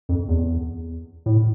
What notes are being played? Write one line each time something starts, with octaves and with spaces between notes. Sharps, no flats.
F2
E2
A2